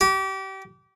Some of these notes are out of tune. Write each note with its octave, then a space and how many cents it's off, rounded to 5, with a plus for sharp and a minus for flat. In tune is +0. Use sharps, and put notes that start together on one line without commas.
G4 -30